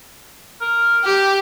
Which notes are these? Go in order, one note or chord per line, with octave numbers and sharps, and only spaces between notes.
A#4
G4 G5